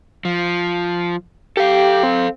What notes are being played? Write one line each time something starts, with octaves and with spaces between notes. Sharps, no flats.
F3
G4 A4 F5
C4